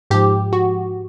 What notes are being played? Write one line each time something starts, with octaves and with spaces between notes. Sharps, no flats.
G#2 F3 G4
F#4